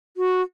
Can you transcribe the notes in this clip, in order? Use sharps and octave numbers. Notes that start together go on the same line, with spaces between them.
F#4